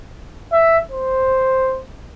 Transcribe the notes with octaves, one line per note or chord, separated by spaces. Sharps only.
E5
C5